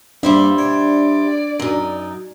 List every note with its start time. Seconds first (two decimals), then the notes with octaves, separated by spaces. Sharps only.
0.23 G2 G3 A#3 D4 C5 D5 E5
0.58 C#5 D5
1.59 F#2 D#4